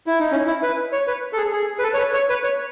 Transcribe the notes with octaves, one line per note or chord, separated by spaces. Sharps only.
E4
D#4
C#4
E4
B4
C#5
B4
A4
G#4
G#4
B4
A4
C#5
B4
C#5
B4
C#5